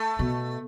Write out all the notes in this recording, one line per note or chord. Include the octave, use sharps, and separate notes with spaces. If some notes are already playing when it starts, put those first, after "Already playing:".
Already playing: A3
B2